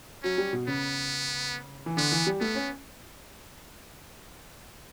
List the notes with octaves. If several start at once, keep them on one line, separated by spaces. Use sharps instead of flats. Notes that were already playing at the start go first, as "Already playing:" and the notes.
F#3 C#4
G3
B2
C#3 B3
E3
D3 B3
E3
G3
A3 B3
C#4